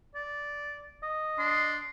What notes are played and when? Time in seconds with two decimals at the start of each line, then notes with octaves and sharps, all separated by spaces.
0.15 D5
1.03 D#5
1.38 D4 C6